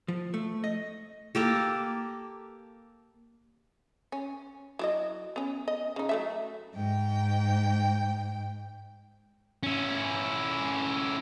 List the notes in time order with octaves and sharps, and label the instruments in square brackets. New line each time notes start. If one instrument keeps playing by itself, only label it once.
[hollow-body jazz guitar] F3
A3
D#5
[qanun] A#3 G4 A4
[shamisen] C#4
F#3 E4 D#5
B3 C#4
D#5
C#3 D#4
F#3 A3 E5
[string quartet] G#2 G5
[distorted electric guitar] C#4 E4